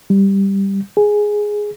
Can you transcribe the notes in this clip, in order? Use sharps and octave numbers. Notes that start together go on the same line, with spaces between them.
G3
G#4